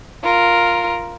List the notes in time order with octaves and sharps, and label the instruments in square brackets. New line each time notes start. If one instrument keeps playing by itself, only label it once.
[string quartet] F4 A#4